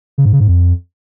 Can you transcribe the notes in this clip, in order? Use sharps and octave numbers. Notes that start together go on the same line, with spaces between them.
C#3
G#2
C#3
G#2
F2